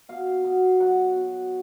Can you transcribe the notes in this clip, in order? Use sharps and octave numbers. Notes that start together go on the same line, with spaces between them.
B2 F5
B2
F#3 F#5
B2